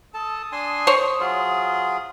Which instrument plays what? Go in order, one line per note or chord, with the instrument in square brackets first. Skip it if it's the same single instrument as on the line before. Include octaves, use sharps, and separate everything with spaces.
[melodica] A4 A5 [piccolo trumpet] D#6
[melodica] D4 G#5 C6
[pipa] C5 C#5
[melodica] F#3 F4 G#4